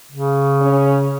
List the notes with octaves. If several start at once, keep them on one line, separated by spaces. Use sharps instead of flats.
C#3
C#4 G#4